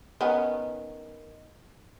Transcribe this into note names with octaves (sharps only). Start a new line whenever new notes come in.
D#3 B3 C#4